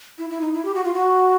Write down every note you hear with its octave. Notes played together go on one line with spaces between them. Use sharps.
E4
E4
D#4
E4
G4
F#4
F4
F#4